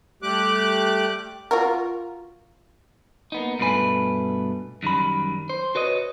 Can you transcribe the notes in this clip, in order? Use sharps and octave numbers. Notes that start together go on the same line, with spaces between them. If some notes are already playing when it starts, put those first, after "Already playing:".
G3 A3 G4 D6 F#6
F4 F#4 A#4
A#3 B3 D#4
G2 B2 A3 B4 G#5
F#2 D#3 G3 B5
C5
F#4 B4 C#5 D#5